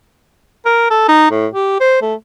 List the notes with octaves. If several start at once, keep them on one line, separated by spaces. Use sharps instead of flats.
A#4
A4
D#4
A2
G4
C5
A3